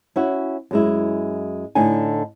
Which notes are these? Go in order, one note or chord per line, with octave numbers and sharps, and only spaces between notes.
C#4 E4 F#4
F#2 G#3 E4
A2 D3 D#4 G#5